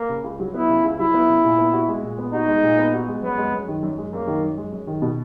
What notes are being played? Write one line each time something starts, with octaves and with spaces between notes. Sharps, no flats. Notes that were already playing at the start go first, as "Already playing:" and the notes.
Already playing: A#3
C#3
C#2
F#3
B3 E4
C#3
C#2
F#3 E4
B3
C#3
A#2
B3
F#4
G#3
A#2
B3
D#4 F#4
G#3
A#2
B3
F#4
G#3
F#2 B3
G#3
F#2
D#3
F#2
G#3
F#2 A#3
D#3
F#2
G#3
F#2
D#3
B2